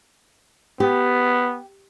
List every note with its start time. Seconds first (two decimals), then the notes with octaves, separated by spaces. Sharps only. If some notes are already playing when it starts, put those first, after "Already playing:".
0.80 B3 G4